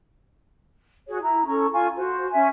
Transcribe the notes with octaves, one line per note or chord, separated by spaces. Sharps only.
F#4 G#4 C#5
E4 A#5
C#4 A4 A#5 C#6
F4 F5 G#5 C#6
F#4 C5
C#4 E5 G#5